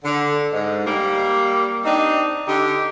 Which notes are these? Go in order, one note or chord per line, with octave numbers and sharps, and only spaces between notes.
D3
G#2
G3 A#3
C4 D4 D#4
D3 D#4 G4